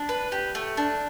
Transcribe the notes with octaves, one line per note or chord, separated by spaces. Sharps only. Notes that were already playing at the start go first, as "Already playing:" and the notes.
Already playing: D4
B4
G4
A3
D4